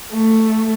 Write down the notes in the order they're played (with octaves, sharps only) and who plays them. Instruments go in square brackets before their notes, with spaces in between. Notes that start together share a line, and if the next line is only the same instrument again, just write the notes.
[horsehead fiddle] A3